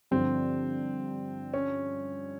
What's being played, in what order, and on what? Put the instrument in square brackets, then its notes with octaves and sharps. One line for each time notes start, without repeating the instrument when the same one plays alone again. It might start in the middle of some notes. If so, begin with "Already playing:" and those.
[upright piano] G2 D3 F3 [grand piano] C4
[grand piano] C#4